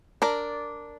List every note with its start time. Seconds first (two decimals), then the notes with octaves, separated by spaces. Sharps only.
0.22 D4 A#4 D5